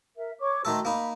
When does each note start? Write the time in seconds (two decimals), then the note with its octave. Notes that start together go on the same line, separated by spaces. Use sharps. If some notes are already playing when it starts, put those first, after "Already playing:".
0.16 A#4 E5
0.40 C#5 C#6 D6
0.65 D#3 A3 F#4 A4 A#5 C6
0.85 A#3 D#4 B5